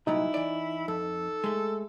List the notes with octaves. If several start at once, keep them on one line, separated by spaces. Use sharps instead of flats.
C2 A#2 F#3 D#4 E4
E3 D5
F2 A4
G#3 A3